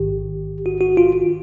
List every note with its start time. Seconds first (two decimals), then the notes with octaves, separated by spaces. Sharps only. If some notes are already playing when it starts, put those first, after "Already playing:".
Already playing: A1 G#2 D#3 G4
0.66 F#4
0.81 F#4
0.97 F4